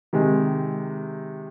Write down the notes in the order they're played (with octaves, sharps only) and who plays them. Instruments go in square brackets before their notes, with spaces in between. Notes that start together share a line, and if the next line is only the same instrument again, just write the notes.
[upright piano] C3 D#3 G#3